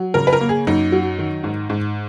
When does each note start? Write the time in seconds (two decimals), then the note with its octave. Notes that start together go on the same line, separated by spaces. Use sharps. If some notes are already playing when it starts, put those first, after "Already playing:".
Already playing: F#3
0.14 C#3 A#4
0.27 B4
0.33 A#4
0.41 A#3
0.49 G#4
0.67 F#2 D#4
0.92 F#3
1.19 D#3
1.44 G#2
1.70 G#2